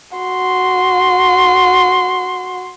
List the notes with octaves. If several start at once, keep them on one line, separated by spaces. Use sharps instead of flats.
F#4 C6